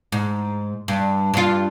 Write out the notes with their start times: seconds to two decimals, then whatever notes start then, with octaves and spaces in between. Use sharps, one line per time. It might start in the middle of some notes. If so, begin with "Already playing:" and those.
0.12 G#2
0.88 G2
1.34 G2 F4